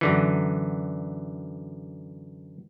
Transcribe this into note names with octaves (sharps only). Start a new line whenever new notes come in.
F#2 D3 E3